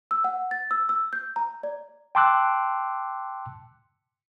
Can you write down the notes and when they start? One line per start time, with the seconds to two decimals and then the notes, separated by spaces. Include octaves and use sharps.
0.11 E6
0.24 F#5
0.51 A6
0.71 E6
0.89 E6
1.13 G6
1.36 A#5
1.63 D5
2.15 G5 A5 C6 D6 E6 F#6